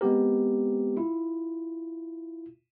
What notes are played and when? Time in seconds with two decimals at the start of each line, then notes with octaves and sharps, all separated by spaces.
0.01 G#3 B3 C4 G4 A#4
0.97 E4 F4